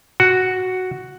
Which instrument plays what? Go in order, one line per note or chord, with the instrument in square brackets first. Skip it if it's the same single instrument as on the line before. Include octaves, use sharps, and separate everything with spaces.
[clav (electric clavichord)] F#4